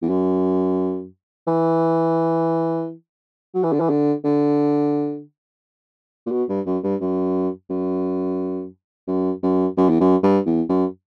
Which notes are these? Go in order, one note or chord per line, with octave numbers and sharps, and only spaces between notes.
E2
F#2
E3
F#3
E3
D3
E3
D3
D3
A#2
B2
G2
F#2
G2
F#2
F#2
F#2
F#2
F#2
E2
F#2
G2
E2
F#2